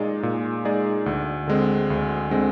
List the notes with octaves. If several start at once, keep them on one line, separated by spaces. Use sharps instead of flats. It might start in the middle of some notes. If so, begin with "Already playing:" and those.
Already playing: A#2 G#3 D#4 G#4 D5
A#2
G#3 D#4 G#4 D5
D2
D3 G#3 C4
D2
D3 G#3 C4